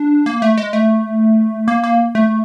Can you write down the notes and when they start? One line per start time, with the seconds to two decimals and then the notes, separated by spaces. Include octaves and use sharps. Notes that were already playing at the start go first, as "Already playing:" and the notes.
Already playing: D4
0.26 A#3
0.42 A3
0.58 G#3
0.73 A3
1.68 A#3
1.84 A#3
2.15 A3